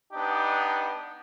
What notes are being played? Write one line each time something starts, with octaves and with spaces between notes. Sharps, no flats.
B3 D4 D#4 G4